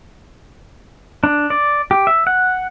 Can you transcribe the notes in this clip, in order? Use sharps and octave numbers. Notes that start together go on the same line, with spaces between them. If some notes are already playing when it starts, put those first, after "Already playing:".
D4
D5
G4
E5
F#5